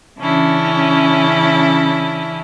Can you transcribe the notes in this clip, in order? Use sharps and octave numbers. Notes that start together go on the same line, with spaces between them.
C#3 E3 C#4 D4 E4